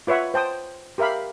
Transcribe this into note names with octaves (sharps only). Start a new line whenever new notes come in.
F4 B4 C#5 E5 F#5
C5 G5 A5 D#6
G4 A#4 E5 F5 B5